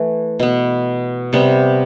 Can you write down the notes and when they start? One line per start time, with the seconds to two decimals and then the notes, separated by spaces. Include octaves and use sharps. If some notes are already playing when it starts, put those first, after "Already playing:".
Already playing: E3 A3
0.40 B2 B3
1.33 C3 G3 B3